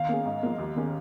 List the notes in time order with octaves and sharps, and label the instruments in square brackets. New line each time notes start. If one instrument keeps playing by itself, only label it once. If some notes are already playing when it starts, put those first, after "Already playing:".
Already playing: [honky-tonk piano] D#3 [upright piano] F5
[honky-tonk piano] A#3 C#4 G#4
G#2
F3 A#3
D#2
D#3 A#3 C#4 G#4